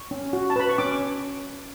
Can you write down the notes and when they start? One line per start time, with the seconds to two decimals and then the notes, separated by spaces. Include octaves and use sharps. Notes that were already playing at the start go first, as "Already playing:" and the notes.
Already playing: C#6
0.11 C#4
0.33 F#4
0.50 A5
0.56 B4 B5
0.69 C#6
0.78 C#4 D6